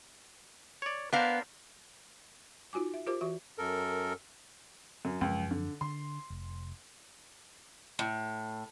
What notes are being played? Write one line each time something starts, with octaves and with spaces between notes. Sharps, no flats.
C#5 D5
B3 D4 A#4 C5 F5
D#4 F4 F#4 G#5 D6
E5
F4 G4 A#4 C5 D6
E3 F#4 E5
F#2 A4 A#4
F#2
C#2 F#2 F3 F#3
D3
D3 C6
F1
A2